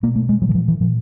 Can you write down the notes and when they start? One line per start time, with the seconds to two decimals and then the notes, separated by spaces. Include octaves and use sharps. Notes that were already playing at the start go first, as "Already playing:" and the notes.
0.03 B2 A#3
0.16 A3
0.29 G#3
0.41 A#2 F#3
0.49 E3
0.55 F3
0.68 E3
0.80 A#2 F3